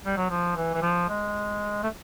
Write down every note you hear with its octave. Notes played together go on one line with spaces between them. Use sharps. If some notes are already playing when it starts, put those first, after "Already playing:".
G3
F#3
F3
E3
E3
F3
G#3
A3